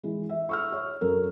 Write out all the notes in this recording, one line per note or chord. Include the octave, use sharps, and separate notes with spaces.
E3 G#3
E5
C#6 E6 F6
C#5
F#2 A4 A#4